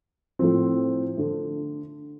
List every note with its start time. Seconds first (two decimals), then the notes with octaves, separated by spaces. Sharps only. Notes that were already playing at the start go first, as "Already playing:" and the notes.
0.39 A2 F3 C4
1.17 D3 A3